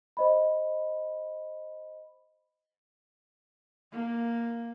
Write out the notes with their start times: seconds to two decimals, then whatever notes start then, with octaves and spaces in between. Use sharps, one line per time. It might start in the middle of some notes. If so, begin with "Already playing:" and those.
0.17 C5 D#5 B5
3.93 A#3